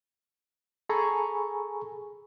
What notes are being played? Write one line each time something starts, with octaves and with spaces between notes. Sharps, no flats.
G#4 A4 G#5 A#5 B5 C#6